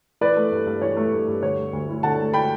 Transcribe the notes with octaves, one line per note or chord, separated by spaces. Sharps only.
E3 B4 D5
A3
G2
G2
E3 C#5
A3
G2
G2
D3 C#5
A3
D2
E4
D3 F#5 A5
A3
G5 B5